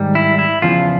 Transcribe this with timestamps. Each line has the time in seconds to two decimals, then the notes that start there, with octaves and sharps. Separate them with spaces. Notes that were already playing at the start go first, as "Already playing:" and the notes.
Already playing: G#2 D#3 G3
0.15 E4
0.39 E4
0.62 E2 C#3 F3 F4